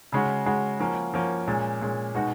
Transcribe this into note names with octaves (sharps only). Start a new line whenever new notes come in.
C#3 G#3 C#4 F#4
C#3 G#3 C#4 F#4
F3 A#3 C#4 F#4
F3 A#3 C#4 F#4
A#2 G#3 C#4
A#2 G#3 C#4
B2 G#3 D#4 F#4